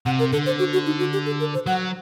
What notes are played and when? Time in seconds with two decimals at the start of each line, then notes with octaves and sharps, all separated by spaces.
0.06 C3 F#5
0.19 A#4
0.32 D3 A4
0.46 C5
0.59 F#4
0.73 F#4
0.86 D#4
0.99 F#4
1.13 G4
1.26 A4
1.40 A#4
1.54 C5
1.66 F#3 F#5